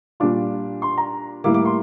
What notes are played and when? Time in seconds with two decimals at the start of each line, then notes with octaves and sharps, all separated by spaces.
0.20 A#2 G3 D4 F4 D6
0.82 C6
0.98 A#5
1.44 A2 G3 A#3 E4 D6
1.54 D6
1.65 C6